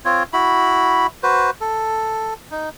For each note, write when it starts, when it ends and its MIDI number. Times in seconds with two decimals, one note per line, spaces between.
0.05 0.23 60
0.05 0.23 65
0.05 0.23 73
0.33 1.07 64
0.33 1.07 66
0.33 1.07 83
1.23 1.50 66
1.23 1.50 71
1.23 1.50 72
1.61 2.34 69
2.51 2.69 63